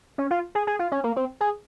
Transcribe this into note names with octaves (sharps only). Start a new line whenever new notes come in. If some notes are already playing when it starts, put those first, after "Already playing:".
C#4
F4
G#4
G#4
F4
C#4
A#3
C4
G#4